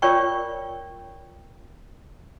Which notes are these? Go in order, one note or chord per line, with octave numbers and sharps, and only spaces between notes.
F4 A#4 C#5 D5 G5 C#6